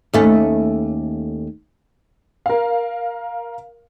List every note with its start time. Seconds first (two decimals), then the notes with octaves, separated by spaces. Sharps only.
0.14 D#2 A3 C#4
2.46 A#4 F5